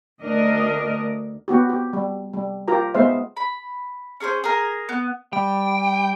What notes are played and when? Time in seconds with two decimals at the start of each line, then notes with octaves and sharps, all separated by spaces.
0.22 D2 D4 A#4 D#5
1.48 B3 F#4 G4
1.69 G4
1.93 G3
2.33 G3
2.68 F4 G4 A#4 A#5
2.94 G#3 B3 C5 E5 F5
3.37 B5
4.20 C#4 G#4 A#4 C5
4.44 G#4 A#4
4.89 B3
5.33 G3 G5